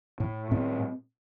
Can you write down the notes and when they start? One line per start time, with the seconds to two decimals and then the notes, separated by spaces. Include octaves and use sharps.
0.20 A2
0.51 A2 C4